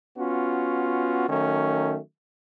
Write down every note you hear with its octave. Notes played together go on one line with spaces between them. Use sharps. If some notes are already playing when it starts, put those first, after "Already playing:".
B3 C#4 F4 F#4
D#3 F#3 A3 C#4